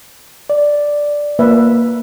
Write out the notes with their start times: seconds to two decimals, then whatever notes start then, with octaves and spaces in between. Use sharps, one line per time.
0.50 D5
1.39 A#3 B4 E5